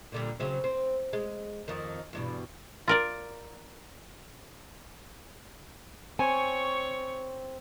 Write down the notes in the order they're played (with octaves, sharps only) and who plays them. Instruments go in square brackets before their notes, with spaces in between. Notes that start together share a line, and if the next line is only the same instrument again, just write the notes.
[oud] A#2 D3 G3
C#3 F#3 C4
C4
G#3
F2 D#3
E2 G2 B2
[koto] F4 A#4 D5
[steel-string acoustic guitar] C4 [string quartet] C#5 C#6 [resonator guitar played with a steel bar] G#5